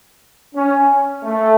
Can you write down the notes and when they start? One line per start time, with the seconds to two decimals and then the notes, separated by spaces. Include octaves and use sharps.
0.55 C#4
1.24 A3